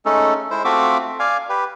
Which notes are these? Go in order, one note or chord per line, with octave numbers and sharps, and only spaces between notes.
G#3 A3 C#4 D#4 A4
G#3 E4 C5
A3 C4 F4 F#4 E5 D6
D5 F5 G#5
G4 B4